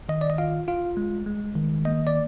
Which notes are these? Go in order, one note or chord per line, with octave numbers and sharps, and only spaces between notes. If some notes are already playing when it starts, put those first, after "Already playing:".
D#3 D#5
D5
D#5
F4 F5
F4 F5
G#3
G#3
D#3
A#3 D#5
D5